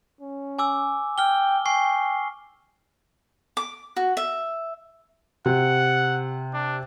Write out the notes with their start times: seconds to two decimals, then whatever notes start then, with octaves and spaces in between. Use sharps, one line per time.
0.21 C#4
0.59 G#5 D6 E6
1.18 G5 F6 G7
1.65 G5 G#5 C#6 C7
3.57 D6
3.96 F#4
4.17 E5
5.46 C3 F#5
6.53 D4